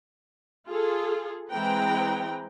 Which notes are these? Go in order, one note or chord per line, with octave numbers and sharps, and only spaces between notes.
F4 G#4 A4
E3 G#3 C4 B4 G5 A#5